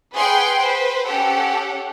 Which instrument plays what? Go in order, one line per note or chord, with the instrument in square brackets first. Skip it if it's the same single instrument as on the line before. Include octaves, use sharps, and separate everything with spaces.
[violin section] G#4 B4 F#5 G5 C6
B4 C5
C#4 G4 A4 F#5